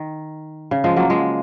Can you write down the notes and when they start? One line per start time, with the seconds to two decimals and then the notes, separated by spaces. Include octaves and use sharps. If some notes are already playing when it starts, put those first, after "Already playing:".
Already playing: D#3
0.71 C#3
0.84 F3 G#3
0.96 F#3 A#3
1.10 F3 G#3